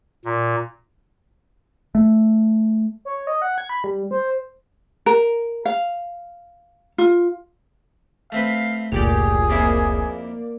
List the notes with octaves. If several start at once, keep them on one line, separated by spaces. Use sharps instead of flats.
A#2
A3
C#5
D#5
F#5
G#6
B5
G3
C5
A#4
F5
F4
A3 C4 B4 F5
F1 C#2 A#2 G4 G#4 C#5 D5
F2 A#3 E4 D5 C#6